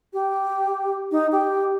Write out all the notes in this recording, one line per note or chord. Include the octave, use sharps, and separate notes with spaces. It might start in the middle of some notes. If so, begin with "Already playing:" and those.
G4
D#4
G4